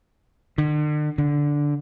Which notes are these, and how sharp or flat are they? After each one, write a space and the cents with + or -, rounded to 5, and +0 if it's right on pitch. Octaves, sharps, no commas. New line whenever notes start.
D3 +40
D3 -10